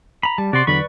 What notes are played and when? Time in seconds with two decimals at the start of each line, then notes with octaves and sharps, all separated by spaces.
0.23 A#5 B5
0.38 G3 A5
0.53 C3 F#4 D5 C6
0.67 E2 D3 F#3 B4 D5 B5 C#6